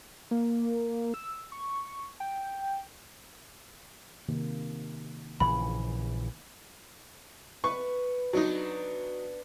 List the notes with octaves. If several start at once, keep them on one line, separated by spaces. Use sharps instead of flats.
A#3
E6
C#6
G5
C3 D#3 A#3
A#1 C#3 E3 B5
B4 C#6
F#3 B3 D4 D#4